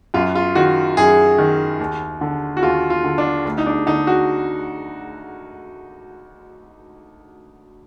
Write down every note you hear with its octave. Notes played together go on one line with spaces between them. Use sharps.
F#2 F4
F4
D#3 F#4
F#2 G#4
D#3
D#2
D3
F#4
D#2 F4
F4
D3
D4
D2
D#4
D4
D3 D#4
F#4